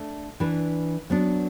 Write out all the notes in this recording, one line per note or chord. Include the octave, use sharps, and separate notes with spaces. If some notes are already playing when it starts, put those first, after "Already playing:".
Already playing: A3 D4 A4
E3 D4 B4
F#3 B3 D4